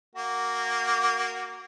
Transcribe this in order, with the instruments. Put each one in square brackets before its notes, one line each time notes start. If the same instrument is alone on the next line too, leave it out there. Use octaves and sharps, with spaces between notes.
[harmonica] A#3 F#4